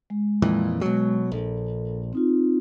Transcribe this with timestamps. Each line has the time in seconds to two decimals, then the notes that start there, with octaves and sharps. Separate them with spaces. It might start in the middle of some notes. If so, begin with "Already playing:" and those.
0.10 G#3
0.42 F2 A#2 E3
0.81 B2 F#3 G#3
1.32 A#1 A4
2.13 C4 D#4 F4